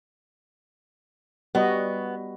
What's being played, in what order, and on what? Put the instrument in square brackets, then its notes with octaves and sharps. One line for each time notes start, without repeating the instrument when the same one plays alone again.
[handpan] G3 F#4 D#5 [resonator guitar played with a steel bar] B3